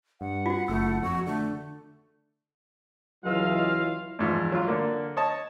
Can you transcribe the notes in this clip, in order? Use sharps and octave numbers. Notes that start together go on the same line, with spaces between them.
G2 F#5
F4 F#4
F#1 A3 E6
F2 F#4
D3 A3
C#2 E3 F#3 F4 D#5 F5 E6
E2 G#2 F3
F#3 F4
D3 A#3 D4
C#5 D#5 A5